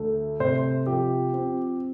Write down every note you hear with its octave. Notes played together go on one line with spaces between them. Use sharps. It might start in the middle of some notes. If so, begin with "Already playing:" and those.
Already playing: D2 A3
C3 C5
F3 G4
C4